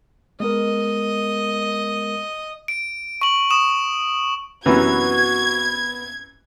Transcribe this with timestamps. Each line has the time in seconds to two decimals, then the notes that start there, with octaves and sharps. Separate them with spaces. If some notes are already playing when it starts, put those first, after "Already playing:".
0.40 G#3 B3 A#4 D#5
2.68 D7
3.21 C#6 F#7
3.51 C#6 D#6 E7
4.66 F#2 C3 E3 B3 F#4 G#6